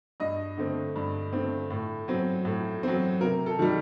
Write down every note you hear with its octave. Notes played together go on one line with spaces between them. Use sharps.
G2 D#5
D3 A3 C4
G2
D3 A3 C4
A2
F#3 C4
A2
F#3 C4
C3 A#4
A4
D#3 G3